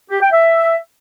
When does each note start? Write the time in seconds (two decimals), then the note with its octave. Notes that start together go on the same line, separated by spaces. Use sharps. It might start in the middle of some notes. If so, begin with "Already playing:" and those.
0.10 G4
0.21 G5
0.32 E5